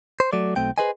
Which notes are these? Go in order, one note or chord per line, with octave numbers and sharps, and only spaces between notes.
C5
F#3 A3 D5
B1 A3 C4 G5
G#4 B4 C5 D#5 G#5